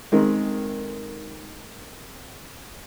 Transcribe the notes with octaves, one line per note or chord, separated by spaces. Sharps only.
D#3 G#3 C4